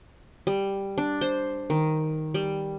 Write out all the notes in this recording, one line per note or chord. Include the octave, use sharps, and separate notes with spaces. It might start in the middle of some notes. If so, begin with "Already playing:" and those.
G3
D4
C5
D#3
G3